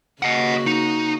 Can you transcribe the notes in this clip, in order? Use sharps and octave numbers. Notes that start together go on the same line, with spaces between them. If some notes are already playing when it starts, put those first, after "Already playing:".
C#3 A#3 F#4 D#5 F#5
D#4